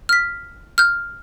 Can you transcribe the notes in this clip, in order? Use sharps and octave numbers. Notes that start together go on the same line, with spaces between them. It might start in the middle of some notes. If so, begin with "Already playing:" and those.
F6 B6
F6 G6